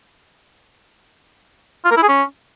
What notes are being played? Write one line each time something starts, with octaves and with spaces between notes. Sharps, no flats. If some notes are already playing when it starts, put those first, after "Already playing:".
F4
A#4
E4
G#4
C#4